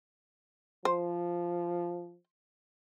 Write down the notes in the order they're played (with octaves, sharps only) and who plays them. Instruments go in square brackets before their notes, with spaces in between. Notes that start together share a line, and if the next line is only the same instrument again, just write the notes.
[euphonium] F3 [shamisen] C5